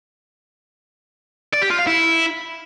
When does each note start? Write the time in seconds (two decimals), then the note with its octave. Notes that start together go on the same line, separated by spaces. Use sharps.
1.54 D5
1.62 G4
1.70 F4
1.79 F5
1.87 E4